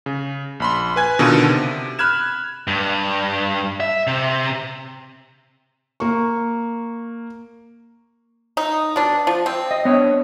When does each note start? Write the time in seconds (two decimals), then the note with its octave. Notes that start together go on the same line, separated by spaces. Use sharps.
0.06 C#3
0.60 A#1 B5 C6
0.96 B4 G#5 G#6
1.19 B2 D3 D#3 F4 A4 D#7
1.49 C3
1.99 B5 F6 F#6 G#6 E7
2.67 G2
3.80 E5
4.07 C3
6.00 A#3 C#6
8.57 D#4
8.96 B2 D4
9.27 F3
9.46 C4
9.71 D#5
9.85 B3 D4 C#5